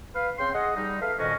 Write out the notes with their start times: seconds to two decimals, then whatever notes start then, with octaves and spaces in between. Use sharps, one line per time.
0.15 B4 F5
0.39 C#3 C4 G5 C6
0.53 G#4 D#5 F#5
0.76 G3 D#4
1.01 A4 B4 E5 F5
1.19 F2 A#2 D#3 C#4 F#4 D#5